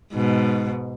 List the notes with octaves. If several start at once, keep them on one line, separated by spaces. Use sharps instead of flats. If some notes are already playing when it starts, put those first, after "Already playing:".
G#2 B2